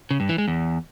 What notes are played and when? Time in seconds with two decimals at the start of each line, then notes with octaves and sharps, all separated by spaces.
0.11 C#3
0.20 G2
0.29 E3
0.38 G#3
0.48 E2